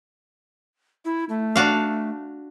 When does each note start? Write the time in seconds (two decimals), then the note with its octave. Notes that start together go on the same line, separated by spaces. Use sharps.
1.05 E4
1.29 A3
1.56 D4 F#4 F5